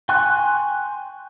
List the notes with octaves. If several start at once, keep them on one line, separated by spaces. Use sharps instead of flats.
G5 G#5 C6 C#6 F#6